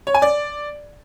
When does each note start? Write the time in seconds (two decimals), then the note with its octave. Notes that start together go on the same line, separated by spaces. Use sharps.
0.07 C#5
0.15 G#5
0.22 D5